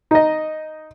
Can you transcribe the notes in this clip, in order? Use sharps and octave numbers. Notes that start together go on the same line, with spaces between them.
D#4 D#5